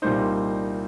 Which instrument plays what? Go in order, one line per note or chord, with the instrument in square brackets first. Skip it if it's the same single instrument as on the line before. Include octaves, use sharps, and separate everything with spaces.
[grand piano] C2 A#2 G3 A#3 D#4 C5